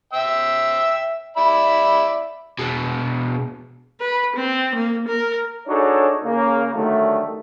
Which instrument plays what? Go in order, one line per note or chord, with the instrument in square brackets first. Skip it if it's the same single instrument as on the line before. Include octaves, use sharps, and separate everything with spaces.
[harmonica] E5 G5 E6
D5 E5 B5
[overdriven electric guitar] B2 G#3
[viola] B4
C4
A#3
A#4
[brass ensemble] D4 D#4 F#4 G#4 A4 C#5
C#3 A#3
D3 D#3 F#3 G3 A3